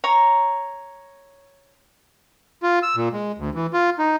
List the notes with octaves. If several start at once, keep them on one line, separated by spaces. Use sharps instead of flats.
C#5 A#5
F4
E6
A#2
G#3
D2
E3
F4
D#4